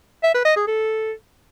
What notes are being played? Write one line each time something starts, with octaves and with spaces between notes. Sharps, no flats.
E5
B4
D#5
G#4
A4